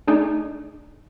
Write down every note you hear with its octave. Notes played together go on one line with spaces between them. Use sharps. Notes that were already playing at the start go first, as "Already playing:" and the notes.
A3 D4 D#4 G#4